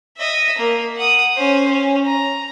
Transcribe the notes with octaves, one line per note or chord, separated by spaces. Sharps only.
D#5 E5
A#3
F#5 D#6
C#4 C5
C#4
A#5